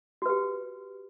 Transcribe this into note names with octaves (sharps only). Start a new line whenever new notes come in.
F#4 G4 B4